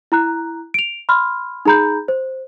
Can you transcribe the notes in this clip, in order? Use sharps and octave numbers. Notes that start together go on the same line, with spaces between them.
E4 A#5 F#6
D7 F7
B5 C6 F6
D#4 G#4 A#5 B5 G6
C5